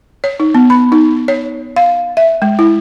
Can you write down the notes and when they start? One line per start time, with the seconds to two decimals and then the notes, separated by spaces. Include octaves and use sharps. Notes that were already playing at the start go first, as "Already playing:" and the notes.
0.24 C#5
0.40 D#4
0.55 B3
0.70 B5
0.92 D#4
1.28 C#5
1.76 F5
2.17 E5
2.42 G#3
2.59 E4